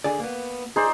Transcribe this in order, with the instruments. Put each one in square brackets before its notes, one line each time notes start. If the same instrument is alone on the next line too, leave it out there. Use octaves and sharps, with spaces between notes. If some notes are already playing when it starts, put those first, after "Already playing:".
[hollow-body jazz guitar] D3 G#4 D5
A#3 B3
[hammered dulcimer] D#4 C5 D5 [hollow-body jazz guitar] G#4